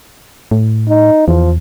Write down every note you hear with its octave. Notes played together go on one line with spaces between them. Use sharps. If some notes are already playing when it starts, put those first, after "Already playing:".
A2
D#4
E2 F3